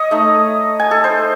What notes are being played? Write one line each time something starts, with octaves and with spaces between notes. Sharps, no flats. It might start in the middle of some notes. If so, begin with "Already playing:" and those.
Already playing: C#5 D#5
A3 D#4
G#5
A4
C5